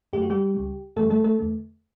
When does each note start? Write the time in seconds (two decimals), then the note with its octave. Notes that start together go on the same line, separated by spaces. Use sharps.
0.13 F#2 D3 F#3 A3 G4
0.22 F#4
0.30 G3 G4
0.54 C#2 C#3 G3
0.96 F#2 C#3 E3 G3 A3 A4
1.10 A3 A4
1.24 A3 A4
1.39 E2 D3 A3